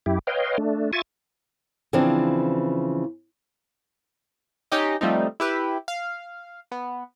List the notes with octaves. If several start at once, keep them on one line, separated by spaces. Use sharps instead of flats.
F#2 E4 G4
B4 C#5 D#5 F5 G5 C6
A3 D4
F4 E5 G#5 C#6 A6
C#3 E3 F3 C4 D4
C#4 D#4 G4 D#5
F3 G3 A3 C4 D#4
E4 G4 B4
F5
B3